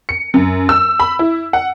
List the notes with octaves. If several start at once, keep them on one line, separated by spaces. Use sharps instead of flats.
C#7
F#2
E6
B5
E4
F#5